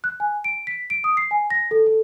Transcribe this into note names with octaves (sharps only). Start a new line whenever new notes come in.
F#6
G#5
D7
B6
D7
D#6
C7
G#5
A#6
A4
A4